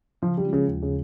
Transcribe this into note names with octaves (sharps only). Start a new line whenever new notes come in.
C#3 F3
G3
F3 G#3 C#4 F4
C#3
D#2
C#3